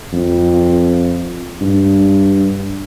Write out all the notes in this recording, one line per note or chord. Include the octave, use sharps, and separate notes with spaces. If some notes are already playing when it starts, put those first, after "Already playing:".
F2
G2